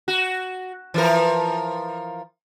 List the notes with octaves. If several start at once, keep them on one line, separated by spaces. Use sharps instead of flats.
F#4
E3 F3 A#4